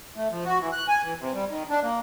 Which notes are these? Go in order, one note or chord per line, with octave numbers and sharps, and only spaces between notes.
A3
F3
F#4
E3
F#6
G#5
E3
C3
G3
D#3
D4
A#3